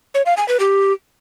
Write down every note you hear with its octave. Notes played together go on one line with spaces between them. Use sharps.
C#5
F5
G#5
B4
G4